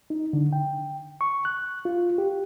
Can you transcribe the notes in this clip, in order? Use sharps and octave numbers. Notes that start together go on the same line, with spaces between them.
D#4
D3
G5
C#6
F#6
F4
G4